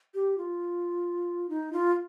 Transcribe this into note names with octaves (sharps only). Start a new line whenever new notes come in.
G4
F4
D#4
F4